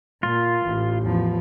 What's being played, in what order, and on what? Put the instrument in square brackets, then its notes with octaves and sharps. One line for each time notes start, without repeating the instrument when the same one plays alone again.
[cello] A#2 [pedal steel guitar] F4
[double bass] A1 [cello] E3
[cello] E2 F3